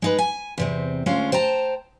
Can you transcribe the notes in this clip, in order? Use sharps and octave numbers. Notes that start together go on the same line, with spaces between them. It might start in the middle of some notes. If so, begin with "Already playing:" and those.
G#3 D#4 B4
G#5
E2 C3 C4
D2 G#3 C#4 F4
C5 G5 A5 A#5